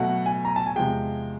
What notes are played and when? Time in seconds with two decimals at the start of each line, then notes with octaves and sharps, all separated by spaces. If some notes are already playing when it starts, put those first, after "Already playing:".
Already playing: B2 F#3 A3 F#5
0.26 G#5
0.45 A#5
0.56 A5
0.66 G#5
0.76 E2 C3 F3 G#3 G5